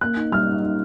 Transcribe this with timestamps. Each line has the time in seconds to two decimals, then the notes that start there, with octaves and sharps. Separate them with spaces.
0.01 A#3 F#6
0.16 D#4
0.32 G3 F6
0.48 D#4
0.63 D#4